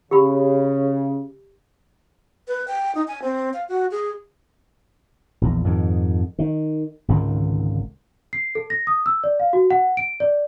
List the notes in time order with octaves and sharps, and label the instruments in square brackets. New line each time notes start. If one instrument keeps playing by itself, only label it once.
[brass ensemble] C#3 [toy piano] G4 B5
[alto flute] B4
G5
D#4
G#5
C4
F5
F#4
G#4
[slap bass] A#1 E2
F2 G#2 D#3
D#3
G#1 C#2 D3 D#3
[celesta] C7
A4
A#6
D#6
E6
D5
F5
F#4
F#5
D7
D5